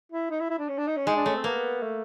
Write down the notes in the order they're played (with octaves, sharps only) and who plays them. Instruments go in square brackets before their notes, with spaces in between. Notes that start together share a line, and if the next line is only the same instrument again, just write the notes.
[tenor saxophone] E4
D#4
E4
E4
D4
C#4
D4
D#4
C#4
[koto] G#3 [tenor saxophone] D#4
[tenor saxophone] D4
[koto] A3 [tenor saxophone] C#4
[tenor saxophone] C4
[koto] A#3 [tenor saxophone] B3
[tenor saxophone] A3